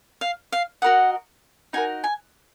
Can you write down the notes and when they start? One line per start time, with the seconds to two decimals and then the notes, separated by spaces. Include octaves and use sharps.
0.21 F5
0.52 F5
0.82 F#4 A#4 D#5 F#5
1.73 D#4 F#4 A#4 G#5
2.04 G#5